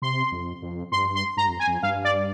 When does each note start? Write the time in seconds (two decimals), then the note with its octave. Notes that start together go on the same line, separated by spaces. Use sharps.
0.02 C3 C6
0.32 F2
0.62 F2
0.92 G2 C6
1.15 C6
1.37 G2 A#5
1.48 F2
1.59 G#5
1.67 F2
1.83 G2 F5
2.04 D5